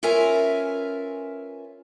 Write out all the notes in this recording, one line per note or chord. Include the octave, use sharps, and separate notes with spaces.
C#4 F4 A#4 B4 E5 G#5